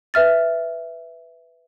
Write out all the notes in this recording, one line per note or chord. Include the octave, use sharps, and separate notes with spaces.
B4 E5 F6 A6